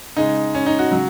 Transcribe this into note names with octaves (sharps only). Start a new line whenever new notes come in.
C#3 G#3 D#4
C#4
D#4
F#4
C#3 F#3